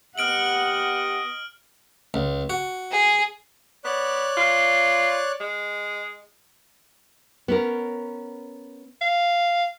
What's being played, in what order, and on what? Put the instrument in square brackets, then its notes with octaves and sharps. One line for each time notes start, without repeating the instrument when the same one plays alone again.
[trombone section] B3 G4 [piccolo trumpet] D#5 [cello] F#5 [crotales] F6 D7 F#7
[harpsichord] C#2
F#4
[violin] G#4
[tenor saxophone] B3 [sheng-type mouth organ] C#5 D5 F#6
[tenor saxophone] F4
G#3
[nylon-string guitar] B3 C#4 A#4
[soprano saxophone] F5